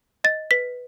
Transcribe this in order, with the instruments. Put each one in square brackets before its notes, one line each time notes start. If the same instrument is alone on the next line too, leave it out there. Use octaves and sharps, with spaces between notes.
[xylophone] D#5 A6
B4 B6